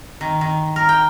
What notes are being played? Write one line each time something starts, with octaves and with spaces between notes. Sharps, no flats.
D#3
D#3
A#4
G5